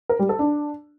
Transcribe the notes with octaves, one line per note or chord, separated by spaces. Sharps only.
A#4
G3
A4
D4